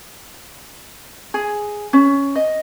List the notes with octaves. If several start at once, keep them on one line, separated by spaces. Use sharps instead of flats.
G#4
C#4
D#5